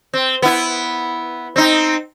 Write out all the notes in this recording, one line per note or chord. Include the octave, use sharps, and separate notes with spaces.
C4
B3 E4
C4 D#4